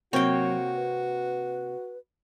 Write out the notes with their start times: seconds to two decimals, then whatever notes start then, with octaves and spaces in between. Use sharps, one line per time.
0.13 C3 F#3 A#3 C4 F#4 C#5 G5
0.74 B4